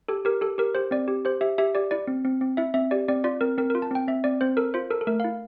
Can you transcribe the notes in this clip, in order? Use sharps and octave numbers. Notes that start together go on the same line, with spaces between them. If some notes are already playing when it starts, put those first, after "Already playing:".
G4 A4
G4 A#4
G4 A4
G4 A#4
G4 C5
C4 D5
G4
G4 C5
G4 E5
G4 E5
G4 D5
E4 D5
C4
C4
C4
E4 E5
C4 E5
G4 D5
C4 D5
F4 D5
C4 A#4
C4 A#4
A#4
F4
A5
C4 G5
C4 E5
C4 D5
C4 C5
A4 A#4
F4 C5
A4 A#4
A4
A3 A#4
F5
E4